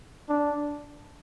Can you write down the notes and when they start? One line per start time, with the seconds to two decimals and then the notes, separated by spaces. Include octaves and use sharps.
0.29 D4